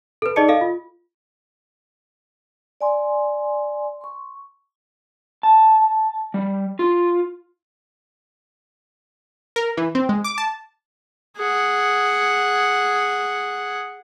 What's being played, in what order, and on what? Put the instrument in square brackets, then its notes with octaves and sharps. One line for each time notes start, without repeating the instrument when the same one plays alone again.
[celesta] A4 B4
D#4 G#4 D5 D#5 A5 C#7
A4 D#5 F5
F4
[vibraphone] D5 G#5 C6
C6 C#6
[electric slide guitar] A5
G3
F4
[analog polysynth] A#4
E3
C4
G#3
D6
A5
[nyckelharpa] G#4 F#5